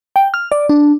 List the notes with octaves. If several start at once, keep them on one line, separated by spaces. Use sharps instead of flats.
G5
F6
D5
D4